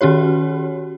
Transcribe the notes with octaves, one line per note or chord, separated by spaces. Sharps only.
D#3 C#4 F#4 G4 C#5